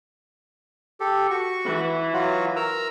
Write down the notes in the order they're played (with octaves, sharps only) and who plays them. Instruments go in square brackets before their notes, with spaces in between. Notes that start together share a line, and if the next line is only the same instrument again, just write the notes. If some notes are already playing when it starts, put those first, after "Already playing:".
[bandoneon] G4 A4
F#4 C#6
[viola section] E3
[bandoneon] F#3 F4 F#4
A#4 A#5 E6